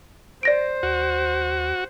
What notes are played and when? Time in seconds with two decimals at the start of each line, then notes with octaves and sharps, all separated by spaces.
0.43 C5 D5 A#6 D7
0.83 D#2 F#4